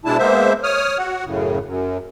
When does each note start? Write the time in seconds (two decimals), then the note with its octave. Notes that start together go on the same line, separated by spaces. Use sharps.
0.05 B2 G#3 D4 E4 A5
0.18 G#3 A#3 B3 C5 E5
0.63 C#5 D#6 F6
0.98 F#4 F#5
1.25 F#2 A2 C#3
1.65 F#2